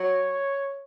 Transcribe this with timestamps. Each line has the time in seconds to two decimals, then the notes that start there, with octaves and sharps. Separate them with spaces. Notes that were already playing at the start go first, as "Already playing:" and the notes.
Already playing: F#3 C#5